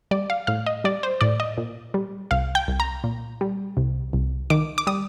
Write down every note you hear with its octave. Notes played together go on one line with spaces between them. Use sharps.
G3 D5
F5
A2 F5
D#5
G3 D5
C5
A2 D5
D#5
A#2
G3
C2 F5
G5
C2
A#5
A#2
G3
C2
C2
D#3 D6
D6
G3 D#6